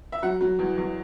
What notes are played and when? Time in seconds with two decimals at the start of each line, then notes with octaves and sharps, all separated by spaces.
0.12 E5
0.22 F#3 F#5
0.41 F#3
0.59 E2
0.78 E2